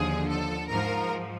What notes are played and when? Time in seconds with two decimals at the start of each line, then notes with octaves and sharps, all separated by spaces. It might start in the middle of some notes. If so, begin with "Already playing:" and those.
Already playing: D#2 D3 F3 G#4
0.29 A4
0.69 G#2 F3 A#4